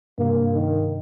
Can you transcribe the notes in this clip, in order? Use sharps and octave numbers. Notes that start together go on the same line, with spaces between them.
G2 C3 A#3
D#3